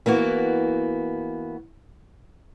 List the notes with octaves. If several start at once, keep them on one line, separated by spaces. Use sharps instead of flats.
E3 A#3 B3 F#4